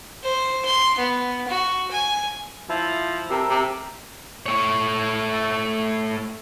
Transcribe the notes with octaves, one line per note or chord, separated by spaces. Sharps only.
C5
C6
B3
F#4
G#5
F3 E4
C3 A4 A#4 E5
C3
A3 C#5